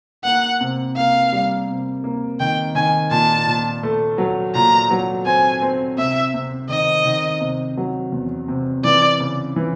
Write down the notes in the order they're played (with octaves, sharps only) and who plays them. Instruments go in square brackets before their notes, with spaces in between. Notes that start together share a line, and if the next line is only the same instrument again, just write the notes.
[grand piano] A#3 [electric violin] F#5
[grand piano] C3
[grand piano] A#3 [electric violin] F5
[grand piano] G3
C3
A#3
[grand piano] D#3 [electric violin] G5
[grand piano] D#3 [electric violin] G#5
[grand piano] A#2 [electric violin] A5
[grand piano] A#2
A3
F#3
[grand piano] A#2 [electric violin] A#5
[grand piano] F#3
[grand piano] C4 [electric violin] G#5
[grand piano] C4
[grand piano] C3 [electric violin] E5
[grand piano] C3
[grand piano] D#3 [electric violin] D#5
[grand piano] D#3
C3
F#3
E2
C3
[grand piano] E3 [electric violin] D5
[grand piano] C#3
E3